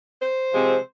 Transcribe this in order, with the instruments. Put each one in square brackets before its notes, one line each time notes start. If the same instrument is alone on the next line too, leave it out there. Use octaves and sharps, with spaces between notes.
[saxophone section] C5
C3 F3 G#3 C4